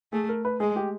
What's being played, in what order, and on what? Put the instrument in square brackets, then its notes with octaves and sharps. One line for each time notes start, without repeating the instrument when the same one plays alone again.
[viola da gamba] A3 [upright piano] G#4
[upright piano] A#4
B4
[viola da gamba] G#3 [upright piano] G#4
[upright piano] G4